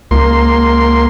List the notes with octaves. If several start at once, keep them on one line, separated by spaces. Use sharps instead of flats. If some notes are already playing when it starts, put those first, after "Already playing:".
C#2 A#3 C6